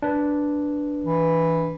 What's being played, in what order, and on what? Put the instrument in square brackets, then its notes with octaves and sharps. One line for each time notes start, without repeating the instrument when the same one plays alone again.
[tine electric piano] D4 B4
[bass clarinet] E3